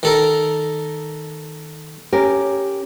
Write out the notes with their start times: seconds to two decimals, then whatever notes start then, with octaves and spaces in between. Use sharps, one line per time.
0.03 D#3 A4 A#4
2.13 C#4 G4 A#4